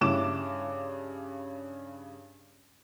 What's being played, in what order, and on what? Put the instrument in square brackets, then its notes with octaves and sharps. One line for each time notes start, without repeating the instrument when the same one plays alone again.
[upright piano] G2 C#3 E4 D6 E7